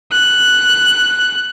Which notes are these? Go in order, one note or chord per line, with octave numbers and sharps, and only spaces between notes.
F#6